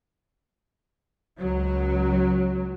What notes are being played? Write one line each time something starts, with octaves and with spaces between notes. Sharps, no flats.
C#2 F#3